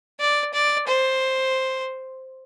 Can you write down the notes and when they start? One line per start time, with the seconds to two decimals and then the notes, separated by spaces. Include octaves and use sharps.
0.20 D5
0.54 D5
0.87 C5